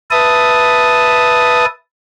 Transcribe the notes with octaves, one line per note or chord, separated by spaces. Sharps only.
B4 E5 A5 D#6